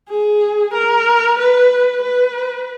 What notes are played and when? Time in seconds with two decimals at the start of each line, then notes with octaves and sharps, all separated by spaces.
0.09 G#4
0.74 A#4
1.38 B4
2.02 B4